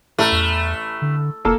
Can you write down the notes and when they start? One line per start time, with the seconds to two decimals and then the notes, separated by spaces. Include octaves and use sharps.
0.19 A1 A3
0.32 E2
1.02 D3
1.45 F1 A#3 A4